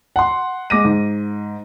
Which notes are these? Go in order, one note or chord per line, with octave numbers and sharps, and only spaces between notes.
F#5 C6
G#3 D6 A#6 D#7
G#2